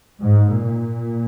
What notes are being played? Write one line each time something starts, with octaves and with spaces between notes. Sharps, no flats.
G#2
A#2